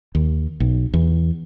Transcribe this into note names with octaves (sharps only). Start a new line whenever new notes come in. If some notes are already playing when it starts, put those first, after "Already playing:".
D#2
B1
E2